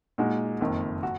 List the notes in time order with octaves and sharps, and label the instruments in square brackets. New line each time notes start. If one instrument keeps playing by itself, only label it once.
[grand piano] A#2 G#3 D#4 F#4
F#1 F2 D#3
F#4